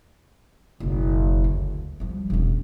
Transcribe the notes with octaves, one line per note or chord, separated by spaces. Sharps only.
F#1 B1
D2
F3 G3
E1 C#4